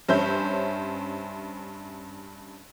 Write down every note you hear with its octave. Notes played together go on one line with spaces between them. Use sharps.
G2 C#4 C5 E5 G6